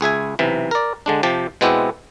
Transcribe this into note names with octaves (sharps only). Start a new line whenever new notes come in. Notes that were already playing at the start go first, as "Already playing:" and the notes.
C#2 G#4 E5 G#5
B1 C3 E3
A#4 D5
D3 G#3 D4
C3 F3 G4 G5 A5
B2 G#3 B3 C4 E4 G4